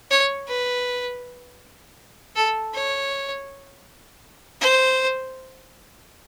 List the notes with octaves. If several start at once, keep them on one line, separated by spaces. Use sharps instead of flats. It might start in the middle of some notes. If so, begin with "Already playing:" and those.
C#5
B4
A4
C#5
C5